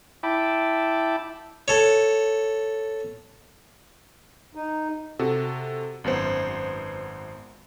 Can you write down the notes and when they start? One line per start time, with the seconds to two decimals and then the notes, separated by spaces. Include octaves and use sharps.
0.23 E4 E5 G5 A5 B5 D6
1.68 A4 C#5
4.55 D#4
5.19 C3 F#4 A4
6.04 G#1 F#2 B3 C5